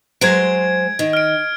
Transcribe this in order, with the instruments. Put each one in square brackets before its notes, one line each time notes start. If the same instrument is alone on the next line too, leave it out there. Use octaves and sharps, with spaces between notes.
[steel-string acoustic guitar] F#3 G#3 C5 [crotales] G#6 D7
[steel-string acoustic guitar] D#3
[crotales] F6 D7